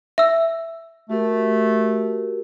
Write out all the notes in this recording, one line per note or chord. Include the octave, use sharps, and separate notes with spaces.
E5 E6
A3 F#4 G4 A#4